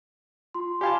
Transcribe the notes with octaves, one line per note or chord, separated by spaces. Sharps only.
F4 C6
G4 F5 G#5 A5 B5 G#6